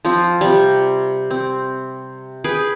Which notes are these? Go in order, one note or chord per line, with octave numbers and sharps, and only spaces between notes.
F3 C4 F4
C3 G3
C4
G#4 B4 G5